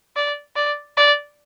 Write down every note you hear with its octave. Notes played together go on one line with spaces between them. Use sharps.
D5
D5
D5